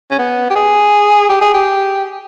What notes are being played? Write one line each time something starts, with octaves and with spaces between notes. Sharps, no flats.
C#4
B3
G4
G#4
G4
G#4
G4